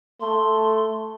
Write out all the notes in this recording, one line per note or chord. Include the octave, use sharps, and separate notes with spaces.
A3 C6